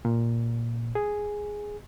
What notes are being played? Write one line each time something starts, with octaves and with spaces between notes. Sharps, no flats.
A#2
G#4